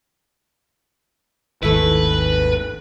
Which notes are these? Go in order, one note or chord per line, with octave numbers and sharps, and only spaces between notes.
G#1 D#2 A3 E4 B4